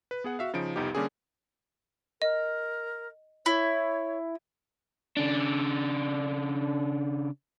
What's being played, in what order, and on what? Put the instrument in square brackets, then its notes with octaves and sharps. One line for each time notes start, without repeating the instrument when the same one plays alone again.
[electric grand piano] B4
B3 G#4 F#5
F#4 E5 F5
C#3 F3 D#4 D7
C2 F2 B3 D#4 G4
D3 G3 A#3 C#4 G4 G#4
[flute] A#4 [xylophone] D#5
[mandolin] E4 [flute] C#5
[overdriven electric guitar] C#3 D4